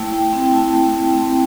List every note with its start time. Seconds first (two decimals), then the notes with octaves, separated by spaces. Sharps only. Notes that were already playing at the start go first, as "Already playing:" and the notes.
Already playing: A3 E4 G5
0.13 A3 G5
0.33 C4 G5
0.53 E4 A5
0.73 A3
0.93 A3
1.13 C4